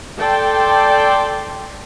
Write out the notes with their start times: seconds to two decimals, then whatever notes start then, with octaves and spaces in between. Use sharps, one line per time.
0.18 A4 D5 G5 C6